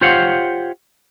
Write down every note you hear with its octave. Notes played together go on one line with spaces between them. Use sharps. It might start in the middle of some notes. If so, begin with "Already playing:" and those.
F4 G4 C5 C#5 F5 F#5